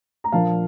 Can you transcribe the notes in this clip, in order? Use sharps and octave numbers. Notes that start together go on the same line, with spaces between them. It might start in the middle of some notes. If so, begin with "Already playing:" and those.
A#5
A#2 F3 A#3 D4 F5 A5